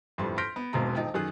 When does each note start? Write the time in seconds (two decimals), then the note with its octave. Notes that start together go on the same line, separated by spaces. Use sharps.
0.18 G1 F2 A2 G3 A5 C6
0.38 C6 F6 G6 A#6 B6 D7
0.56 B3
0.73 E1 B1 B2 G#3 C4 A#5
0.96 D#1 D#4 G5
1.14 F#2 D#3 G#4 F#6